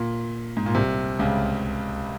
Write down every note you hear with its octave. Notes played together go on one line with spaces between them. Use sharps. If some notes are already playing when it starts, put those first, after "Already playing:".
Already playing: A#2
G#2
A#2
C2 C3
C#2 C#3